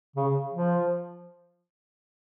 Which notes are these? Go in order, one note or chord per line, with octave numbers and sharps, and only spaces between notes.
C#3
F3